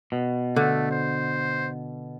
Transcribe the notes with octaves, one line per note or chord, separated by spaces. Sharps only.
B2
D3 A3
C5